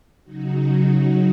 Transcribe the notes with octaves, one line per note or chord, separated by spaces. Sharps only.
C#3 F#3 D#4 F#4